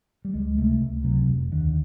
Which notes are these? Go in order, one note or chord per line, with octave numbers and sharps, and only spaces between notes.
G3
C#2 G#3
C3 A3
C#2
C3 F#3
F1
D#2 D3